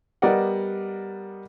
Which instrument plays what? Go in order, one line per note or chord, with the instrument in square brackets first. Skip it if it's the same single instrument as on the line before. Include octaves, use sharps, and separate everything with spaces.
[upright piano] G3 B3 A#4 D5 D#5 F#5